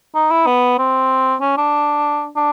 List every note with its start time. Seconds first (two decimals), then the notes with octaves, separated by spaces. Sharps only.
0.15 D#4
0.31 E4
0.47 B3
0.78 C4
1.41 C#4
1.58 D4
2.36 D4